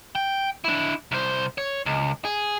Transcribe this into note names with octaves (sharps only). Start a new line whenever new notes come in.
G5
D4 E4
C2 C5
C#5
C#2
G#4